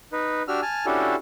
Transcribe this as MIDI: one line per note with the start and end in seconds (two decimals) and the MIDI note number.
0.12 0.43 63
0.12 0.43 71
0.48 0.60 62
0.48 0.60 66
0.48 0.60 67
0.48 0.60 88
0.48 0.60 89
0.62 0.86 80
0.62 0.86 81
0.62 0.86 89
0.86 1.16 61
0.86 1.16 62
0.86 1.16 64
0.86 1.16 66
0.86 1.16 67
0.86 1.16 69